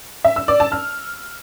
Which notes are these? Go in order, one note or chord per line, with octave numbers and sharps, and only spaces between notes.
E5
E6
D5
A5
F6